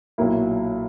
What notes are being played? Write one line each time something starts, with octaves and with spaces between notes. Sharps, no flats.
B1 A#2 F#3 A#3 E4